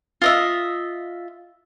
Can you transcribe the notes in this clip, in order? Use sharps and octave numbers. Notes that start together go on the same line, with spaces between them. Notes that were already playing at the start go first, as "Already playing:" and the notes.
F4 D#5 E5